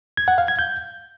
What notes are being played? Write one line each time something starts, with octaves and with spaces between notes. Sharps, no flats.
G#6
F#5
F5
G#6
G6